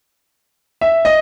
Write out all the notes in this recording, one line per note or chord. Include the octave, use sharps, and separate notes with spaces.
E5
D#5